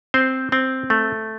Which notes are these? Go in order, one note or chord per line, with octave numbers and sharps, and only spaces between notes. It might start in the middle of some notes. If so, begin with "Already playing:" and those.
C4 C5
C4
A3